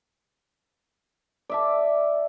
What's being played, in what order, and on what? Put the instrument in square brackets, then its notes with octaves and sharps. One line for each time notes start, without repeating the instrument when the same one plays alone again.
[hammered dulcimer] D5 E5 A5